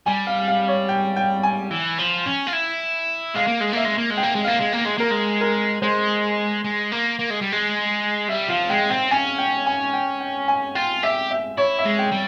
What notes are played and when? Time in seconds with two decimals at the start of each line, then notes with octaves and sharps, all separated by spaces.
0.06 G3 G#5
0.27 F5
0.48 F5
0.68 C#5
0.89 G5
1.16 G5
1.43 G#5
1.71 E3
1.98 F3
2.26 C#4
2.47 F4
2.53 E4
3.35 G#3 F5
3.48 A#3
3.61 G#3
3.73 A#3 E5
3.85 G#3
3.98 A#3
4.10 G#3
4.17 G5
4.23 A#3
4.36 G#3
4.44 A#3 F5
4.61 G#3
4.73 A#3
4.86 G#3
4.98 A#3 A#4
5.11 G#3
5.41 A#4
5.82 G#3 C5
6.64 G#3
6.92 A#3
7.19 A#3
7.30 G#3
7.41 G3
7.52 G#3
8.29 G3 E5
8.49 F3 F5
8.69 G#3 G5
8.90 C4 G5
9.11 C#4 G#5
9.38 G5
9.66 G#5
9.93 G5
10.21 G5
10.48 G#5
10.75 F4 G5
11.03 G4 E5
11.30 E5
11.57 E4 C#5
11.78 E5
11.85 G#3
11.99 G5
12.12 G3